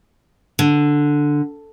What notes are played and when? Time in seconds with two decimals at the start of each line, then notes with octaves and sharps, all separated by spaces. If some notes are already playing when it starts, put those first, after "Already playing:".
0.59 D3